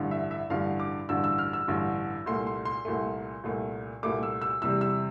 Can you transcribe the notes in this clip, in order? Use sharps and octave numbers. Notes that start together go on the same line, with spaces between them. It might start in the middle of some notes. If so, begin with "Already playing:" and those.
Already playing: A1 G2 D3
E5
E5
A1 G2 D3 F5
D6
A1 G2 D3 E6
E6
F6
E6
A1 G2 D3
C2 A#2 A3 C6
C6
C6
C2 A#2 A3
C2 A#2 A3
C2 A#2 A3 D6
E6
E6
E2 C3 G3 E6
E6